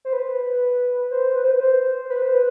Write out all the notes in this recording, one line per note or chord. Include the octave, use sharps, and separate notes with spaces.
C5
B4
C5
B4
C5
B4
C5
B4
C5
B4